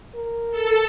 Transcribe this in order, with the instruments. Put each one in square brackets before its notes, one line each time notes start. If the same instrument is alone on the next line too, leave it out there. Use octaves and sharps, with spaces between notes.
[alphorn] A#4
[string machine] A4